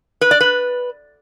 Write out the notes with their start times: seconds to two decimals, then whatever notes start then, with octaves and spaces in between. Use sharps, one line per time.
0.21 B4
0.31 D5
0.41 B4